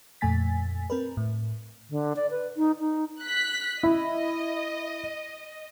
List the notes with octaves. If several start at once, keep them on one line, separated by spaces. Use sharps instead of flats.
F2 A#2 A3 G#5 A6 B6
C4 A#4 B4
A2
D3
D5
B4
D#4
D#4
F#6 B6
E4 D#5